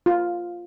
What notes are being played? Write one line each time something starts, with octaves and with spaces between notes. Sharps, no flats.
F4